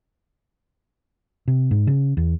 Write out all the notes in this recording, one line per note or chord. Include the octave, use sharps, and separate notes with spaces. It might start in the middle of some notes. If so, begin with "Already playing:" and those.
C3
G#2
C#3
E2